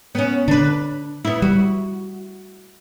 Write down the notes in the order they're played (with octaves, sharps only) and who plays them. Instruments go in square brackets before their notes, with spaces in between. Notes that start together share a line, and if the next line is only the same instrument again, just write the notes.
[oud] B3 C#4
[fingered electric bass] D3 [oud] D4 B4
[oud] B3 E4
[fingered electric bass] G3 [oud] F#4